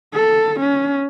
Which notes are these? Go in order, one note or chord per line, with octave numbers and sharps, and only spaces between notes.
A4
C#4